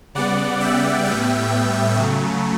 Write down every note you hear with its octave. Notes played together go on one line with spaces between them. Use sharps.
C#3 G3 B3 D5 F#5
E5 G5
A2 G3 B3 E5 G5
C#3 F#3 A3